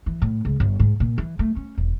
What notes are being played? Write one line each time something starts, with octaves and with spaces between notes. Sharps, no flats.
E3
A2
C#2
G1
G#2
A#2
E3
A3
C#4
E1